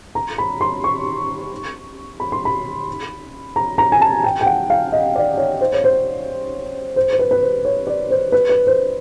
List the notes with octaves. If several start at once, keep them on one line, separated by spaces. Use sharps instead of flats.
A#5
B5
C6
C#6
B5
C6
B5
A#5
A#5
G#5
A5
G5
G5
F#5
F5
D#5
D5
C#5
C5
C#5
C5
C5
C5
B4
B4
C5
C#5
D5
C5
B4
B4
C5